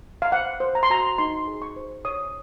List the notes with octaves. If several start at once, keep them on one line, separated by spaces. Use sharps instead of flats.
F5
C5 F#5
C5
A#5
C6
F#4 A#5
D#4 C6
G#4
C#6
C5
C#5 D#6